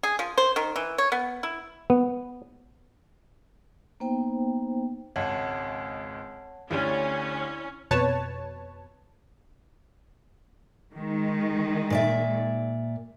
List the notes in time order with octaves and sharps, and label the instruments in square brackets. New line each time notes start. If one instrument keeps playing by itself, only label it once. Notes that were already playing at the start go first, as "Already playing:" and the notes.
[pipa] G#4
F3
C5
D#3
E3
C#5
B3
E4
[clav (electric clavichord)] B3
[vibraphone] A#3 B3 D#4 C5 G5
[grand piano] G#1 C#2 [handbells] C#5 F#5 A5
[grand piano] D2 D3 G4 [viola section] C#4 [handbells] E4 C#5 D5
[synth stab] F2 B2 B4 C#5 A5
[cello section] D#3 G#3
[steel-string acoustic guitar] A#2 D5 E5